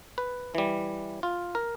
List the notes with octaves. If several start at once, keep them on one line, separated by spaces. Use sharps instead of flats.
B4
E3 G3
F4
A#4